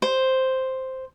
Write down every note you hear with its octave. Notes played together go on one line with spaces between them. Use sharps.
C5